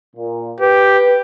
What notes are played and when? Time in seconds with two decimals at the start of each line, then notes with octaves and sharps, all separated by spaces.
0.16 A#2
0.61 G4 B4